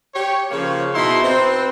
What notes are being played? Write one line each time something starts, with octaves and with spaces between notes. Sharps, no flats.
G4 C#5
C#3 F3 A#3 C#5
B2 D#4 E4 C6
C4 B4 C5